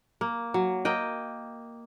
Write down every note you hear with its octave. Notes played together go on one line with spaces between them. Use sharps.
A#3
F#3
A#3 D#5 G5